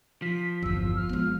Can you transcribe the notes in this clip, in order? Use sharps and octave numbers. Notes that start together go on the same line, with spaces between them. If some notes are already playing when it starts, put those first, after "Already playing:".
F3 B6
G1 E2 E6
F6
G#3 B3